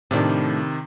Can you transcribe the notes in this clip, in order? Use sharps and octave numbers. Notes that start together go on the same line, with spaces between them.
A2 C3 D#3 F3 D4